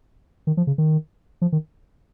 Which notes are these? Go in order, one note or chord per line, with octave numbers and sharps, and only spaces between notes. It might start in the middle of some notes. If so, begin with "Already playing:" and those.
D#3
F3
C#3
D#3
F3
D#3